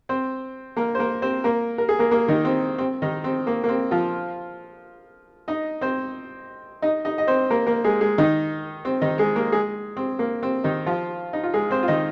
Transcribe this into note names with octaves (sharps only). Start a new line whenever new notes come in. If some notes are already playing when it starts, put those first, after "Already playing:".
C4 C5
A#3 A#4
C5
A#3 A#4
C4 C5
A#3 A#4
A#4
G#4
A#3 A#4
A#3 A#4
D#3 D#4
C4
C4
D#3 D#4
C4
A#3
A#3
C4
F3 F4
D#4 D#5
C4 C5
D#4 D#5
D#4 D#5
D#5
C4 C5
A#3 A#4
A#3 A#4
G#3 G#4
G#3 G#4
D#3 D#4
C4
D#3 D#4
G#3 G#4
A#3 A#4
G#3 G#4
C4
A#3
C4
D#3 D#4
F3 F4
D#4
F4
G#3 G#4
C4 C5
F4
D#3 D#4